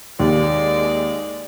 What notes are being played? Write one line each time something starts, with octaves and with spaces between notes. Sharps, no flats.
D#2 G#3 D5